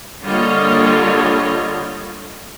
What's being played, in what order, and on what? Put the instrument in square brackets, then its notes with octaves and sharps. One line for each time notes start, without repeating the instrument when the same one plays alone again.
[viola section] D3 G3 A#3 F4 C#5 D#5